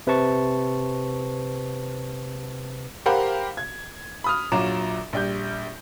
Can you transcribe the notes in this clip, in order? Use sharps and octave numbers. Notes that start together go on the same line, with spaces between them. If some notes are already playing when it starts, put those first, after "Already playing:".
C3 B4 C5 A5 C#6 A6
G4 A#4 C5 F5 F#5 B5
G#6
B5 D#6 F6
A#1 F#3 F4 A#5 D6 E7
A#1 G3 G6